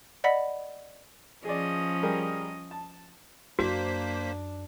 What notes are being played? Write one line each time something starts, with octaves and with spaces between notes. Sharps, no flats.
D5 D#5 F#5 B5 B6
F3 C#4 G#4 D5 D#5
G3 G#4 A#4
A5
F#2 A#3 D4 F#4 C5 B6